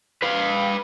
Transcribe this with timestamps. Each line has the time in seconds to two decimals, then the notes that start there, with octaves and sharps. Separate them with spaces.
0.23 B4 F5